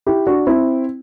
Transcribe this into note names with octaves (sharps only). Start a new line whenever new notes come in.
E4 G4
D4 F#4
C4 E4